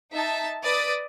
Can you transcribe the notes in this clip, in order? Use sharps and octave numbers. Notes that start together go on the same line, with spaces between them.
D#4 E5 A5
B4 D5 D#6